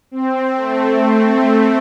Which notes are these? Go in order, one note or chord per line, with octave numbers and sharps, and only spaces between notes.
C4
A3
A3
A3